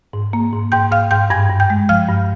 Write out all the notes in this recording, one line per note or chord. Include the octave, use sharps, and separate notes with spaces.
G#2
A#3
G#2
G#2 G5 G6
G#2 F5 F6
G#2 G5 G6
G2 G#5 G#6
G2
G5 G6
G#3
F3 F5 F6
G2